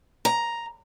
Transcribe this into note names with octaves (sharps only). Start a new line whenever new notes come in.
A#5